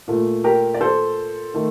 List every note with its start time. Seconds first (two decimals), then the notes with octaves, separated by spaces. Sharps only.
0.08 A#2 A3
0.44 G4 A#4
0.74 D5
0.81 A4 C5
1.54 D#3 A3